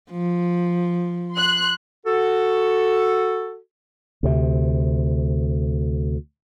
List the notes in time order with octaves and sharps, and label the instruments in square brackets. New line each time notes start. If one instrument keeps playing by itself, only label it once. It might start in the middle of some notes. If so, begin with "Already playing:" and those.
[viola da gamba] F3
[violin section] C6 F#6
[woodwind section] F#4 A4
[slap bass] D2 C3